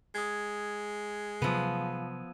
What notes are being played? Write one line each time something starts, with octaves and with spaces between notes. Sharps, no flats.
G#3 D#6 G#6
C3 F3 F#3 B3 E6 D#7